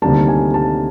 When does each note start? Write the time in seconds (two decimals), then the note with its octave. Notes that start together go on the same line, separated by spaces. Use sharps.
0.02 D2 C3 D#3 G3 A#3 A5
0.28 G#5
0.54 A5